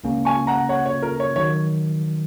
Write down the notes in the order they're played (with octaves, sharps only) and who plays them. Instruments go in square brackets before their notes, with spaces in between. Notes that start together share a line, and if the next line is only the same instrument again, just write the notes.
[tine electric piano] C#2 C#3 A#3 C#4
[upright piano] G#5 C#6
F#5 A#5
C#5 F#5
C#5
A#4
C#5
[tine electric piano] D#3 F#3 [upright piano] C#5